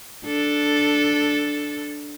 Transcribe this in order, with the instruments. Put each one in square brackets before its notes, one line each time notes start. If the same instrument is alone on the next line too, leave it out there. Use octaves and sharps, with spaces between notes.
[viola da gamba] D4 A4